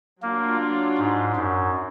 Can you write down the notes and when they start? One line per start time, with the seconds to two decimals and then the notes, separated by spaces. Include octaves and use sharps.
0.22 F#3 A#3 D4 F4
0.98 G#2
1.36 F#2